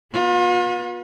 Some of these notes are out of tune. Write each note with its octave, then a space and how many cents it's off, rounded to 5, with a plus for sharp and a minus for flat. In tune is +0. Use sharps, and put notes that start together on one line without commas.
B3 -30 F4 +40